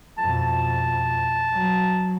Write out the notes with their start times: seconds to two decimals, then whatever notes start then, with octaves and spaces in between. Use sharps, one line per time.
0.18 F2 B2 A5
1.53 F#3